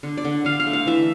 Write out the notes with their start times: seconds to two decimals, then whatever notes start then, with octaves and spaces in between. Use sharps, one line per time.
0.03 D3
0.17 D5
0.25 D3
0.45 D3 F5
0.60 F5
0.66 A3
0.73 F5
0.87 E3 E5